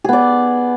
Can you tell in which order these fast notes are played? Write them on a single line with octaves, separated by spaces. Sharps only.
G#4 B3 D5